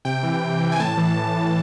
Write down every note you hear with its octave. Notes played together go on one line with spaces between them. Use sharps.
C3 G5
E3
C3
E3
G#5
A2 A5
E3
A2
E3